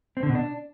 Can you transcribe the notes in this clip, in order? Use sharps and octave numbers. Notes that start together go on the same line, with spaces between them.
C4
D3
B2
D4